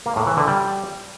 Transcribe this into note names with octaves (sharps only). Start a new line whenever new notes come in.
A#3
A2
E3
D3
G3